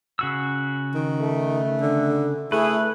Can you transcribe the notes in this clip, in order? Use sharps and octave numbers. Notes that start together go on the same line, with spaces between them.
C#3 F#4 E6
D#3
A3
D3
A3 E4 G#4 B4